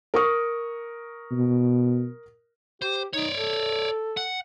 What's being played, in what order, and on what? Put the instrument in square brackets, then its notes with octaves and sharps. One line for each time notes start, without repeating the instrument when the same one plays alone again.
[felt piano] A#4 C#6 D#6
[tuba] B2
[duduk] G4 [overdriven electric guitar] C5
[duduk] D#4 [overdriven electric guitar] C#5 D5
[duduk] A4
[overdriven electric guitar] F#5